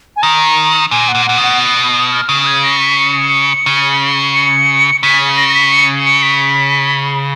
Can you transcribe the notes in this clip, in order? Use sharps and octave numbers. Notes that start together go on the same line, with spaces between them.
G#5
D#3 A#5
A#2 G#5
F#5
A#2
A#2 F#5
B2
F#5
B5
D#6
F6
C#3 D#6
G#6
A#6
B6
C#7
C#3
C#7
C#3 B6
A#6
A#6
B6
C#7
C#7
B6